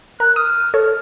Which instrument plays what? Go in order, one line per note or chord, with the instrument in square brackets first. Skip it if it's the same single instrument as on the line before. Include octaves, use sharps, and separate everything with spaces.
[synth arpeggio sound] A#4 [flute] F#6
[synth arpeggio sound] D#6 [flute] F6
[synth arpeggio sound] A4 C#5